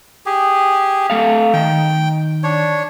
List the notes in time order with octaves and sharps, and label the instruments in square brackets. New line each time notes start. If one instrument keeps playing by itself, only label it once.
[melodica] G4 G#4
[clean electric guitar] A3 A4 F5
[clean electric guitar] D#3 [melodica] G5
[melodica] D4 C#5